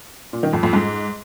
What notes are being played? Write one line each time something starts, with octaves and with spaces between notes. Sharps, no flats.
A#2
D#3
F2
F2
G#2